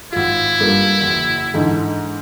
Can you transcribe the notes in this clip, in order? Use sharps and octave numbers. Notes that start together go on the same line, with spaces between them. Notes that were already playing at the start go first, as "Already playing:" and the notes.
G#1 E4 F4
G2 A#3 F4
F#1 E2
G#2 D3 E3